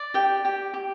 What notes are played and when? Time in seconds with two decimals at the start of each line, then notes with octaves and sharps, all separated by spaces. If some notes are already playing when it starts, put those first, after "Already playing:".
Already playing: D5
0.14 G4 G5
0.45 G4
0.74 G4